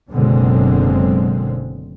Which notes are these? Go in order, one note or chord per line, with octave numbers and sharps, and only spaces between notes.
F#1 F#2 B2 D3 G#3 C4